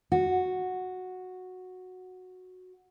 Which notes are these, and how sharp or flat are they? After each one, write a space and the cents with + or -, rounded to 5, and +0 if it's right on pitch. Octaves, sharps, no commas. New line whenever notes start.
F#4 -5